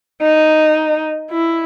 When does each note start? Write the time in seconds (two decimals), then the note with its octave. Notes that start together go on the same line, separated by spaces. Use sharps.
0.22 D#4
1.31 E4